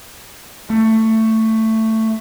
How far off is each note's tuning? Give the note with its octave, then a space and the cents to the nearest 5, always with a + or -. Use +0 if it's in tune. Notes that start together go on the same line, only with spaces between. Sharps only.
A3 +15